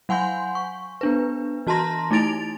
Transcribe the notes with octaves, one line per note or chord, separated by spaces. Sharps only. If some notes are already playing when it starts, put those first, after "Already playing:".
F#3 F#5 G#5 C6 G6
C#6
B3 D4 B4
E3 F#4 A5 A#5 C6 A#6
A3 D#4 E4 A6 D7 F7